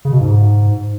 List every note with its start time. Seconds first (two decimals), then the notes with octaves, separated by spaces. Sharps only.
0.05 C#3
0.13 B2
0.21 G#2